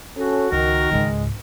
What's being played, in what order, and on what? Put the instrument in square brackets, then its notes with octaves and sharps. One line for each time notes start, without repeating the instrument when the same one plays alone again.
[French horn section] C#4 A4 [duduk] F#4
[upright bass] C#2 [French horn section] D#3 [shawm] A#4
[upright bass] C#2 G#2 [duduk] G#3